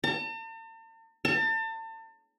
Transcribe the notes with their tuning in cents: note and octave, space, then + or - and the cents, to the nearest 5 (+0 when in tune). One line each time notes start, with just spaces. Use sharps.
A5 +45
A5 +35